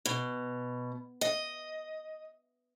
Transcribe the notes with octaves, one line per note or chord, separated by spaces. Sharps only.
B2
D#5